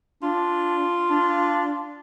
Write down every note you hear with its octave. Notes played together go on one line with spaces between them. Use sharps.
D4 F4
D4